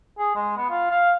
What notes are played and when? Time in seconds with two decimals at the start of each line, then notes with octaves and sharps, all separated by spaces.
0.19 G#4
0.35 G#3
0.57 B3
0.70 F4
0.91 F5